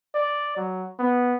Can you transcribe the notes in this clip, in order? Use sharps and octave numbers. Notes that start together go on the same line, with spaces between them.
D5
F#3
B3